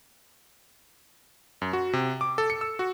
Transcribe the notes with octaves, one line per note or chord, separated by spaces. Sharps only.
F#2
F#4
C3
D6
A4
C#7
E6
F#4